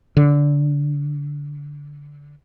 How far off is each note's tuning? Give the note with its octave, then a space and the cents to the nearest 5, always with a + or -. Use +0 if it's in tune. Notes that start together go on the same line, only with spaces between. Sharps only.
D3 -15